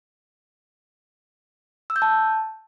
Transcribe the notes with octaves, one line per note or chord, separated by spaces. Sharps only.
E6
G6
A5